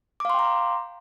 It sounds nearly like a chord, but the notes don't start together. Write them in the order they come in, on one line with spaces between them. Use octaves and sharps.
D6 F5 C6 G5 A#5